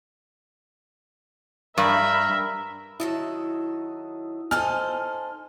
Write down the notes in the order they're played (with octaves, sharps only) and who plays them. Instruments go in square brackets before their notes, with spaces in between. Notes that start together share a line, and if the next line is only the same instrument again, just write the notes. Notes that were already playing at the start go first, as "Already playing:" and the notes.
[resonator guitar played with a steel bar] G2 [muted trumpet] A#4 [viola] E5 [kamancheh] B5
[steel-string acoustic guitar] D#3 F#3 A4 [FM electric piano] E4 D#6 E6
[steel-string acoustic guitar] D#4 A4 C5 [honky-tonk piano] G#5 F6